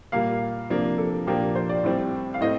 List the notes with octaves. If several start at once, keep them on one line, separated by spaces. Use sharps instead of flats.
A#2 G3 A#3 F5
C3 F3 A#3 D4
A4
A#2 F3 A#3 D4 G4
C5
D5
A2 G3 C4
F5
A2 A3 C4 D#5